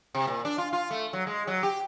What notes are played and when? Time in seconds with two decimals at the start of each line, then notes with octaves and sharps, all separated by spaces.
0.15 C3
0.27 A#2
0.45 D4
0.58 F4
0.73 F4
0.91 A3
1.13 F#3
1.27 G#3
1.47 F#3
1.63 G4